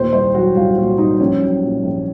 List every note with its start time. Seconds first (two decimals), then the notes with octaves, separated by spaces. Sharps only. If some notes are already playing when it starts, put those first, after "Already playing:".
Already playing: D#2 A#2 C5
0.13 C2 C5
0.35 F#3 F#4
0.55 C2 F4
0.77 A#2 F#4
0.98 C2 D#4
1.20 A#1 C#4
1.41 F#3
1.63 A#2
1.83 A#1